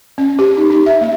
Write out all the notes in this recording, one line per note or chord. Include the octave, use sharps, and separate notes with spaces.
C#4
G4
D#4
D#4
E5
A#3